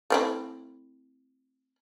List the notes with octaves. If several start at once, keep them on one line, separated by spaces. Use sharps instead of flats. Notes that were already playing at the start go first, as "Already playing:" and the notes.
A3 C4 E4